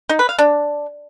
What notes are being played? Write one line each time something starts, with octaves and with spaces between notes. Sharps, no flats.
D#4
B4
F5
D4